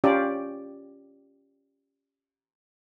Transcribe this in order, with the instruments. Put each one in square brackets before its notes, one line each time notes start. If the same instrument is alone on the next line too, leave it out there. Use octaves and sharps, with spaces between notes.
[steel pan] C#4 F4 G4 D5